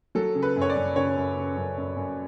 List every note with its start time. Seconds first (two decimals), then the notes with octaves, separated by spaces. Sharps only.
0.15 F#3 A4
0.35 C#3
0.43 B4
0.56 F#2
0.61 C#5
0.70 D5
0.76 F#2
0.96 C#3 C#5
1.17 F#2
1.36 C#3
1.57 F#2
1.77 F#2
1.96 F#2